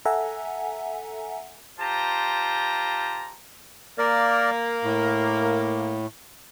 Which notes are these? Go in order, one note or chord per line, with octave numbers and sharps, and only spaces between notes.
A4 E5 F#5 G#5 A#5
F4 G4 C5 A5 A#5
A#3 A#4 D5
A2